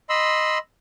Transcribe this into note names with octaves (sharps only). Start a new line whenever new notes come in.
D#5 B5 C6 E6